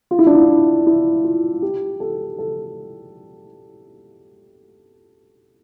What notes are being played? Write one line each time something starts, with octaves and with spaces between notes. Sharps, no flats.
F4
E4
D4
E4
E4
F4
G4
A4
A4